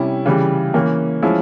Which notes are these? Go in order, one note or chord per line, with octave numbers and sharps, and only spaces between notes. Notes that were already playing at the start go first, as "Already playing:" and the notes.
Already playing: C3 G3 C#4 E4
C#3 E3 G3
E3 A#3 C#4
F3 G#3 C#4 E4